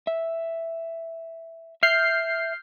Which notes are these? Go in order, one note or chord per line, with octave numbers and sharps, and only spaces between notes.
E5
E5 F6 G6 C7